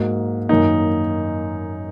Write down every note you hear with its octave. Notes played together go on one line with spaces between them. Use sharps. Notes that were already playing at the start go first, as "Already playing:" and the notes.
Already playing: G#2 F#3 A#3
F#2 D#3 A#3 D#4